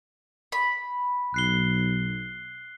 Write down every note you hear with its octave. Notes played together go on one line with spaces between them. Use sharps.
B5
B1 F#6 C7 G7